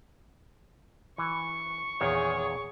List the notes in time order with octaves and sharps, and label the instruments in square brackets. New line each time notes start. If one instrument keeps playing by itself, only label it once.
[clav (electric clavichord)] E3 [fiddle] C#6
[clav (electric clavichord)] E2 A#2 D#3 [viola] G#4 C#5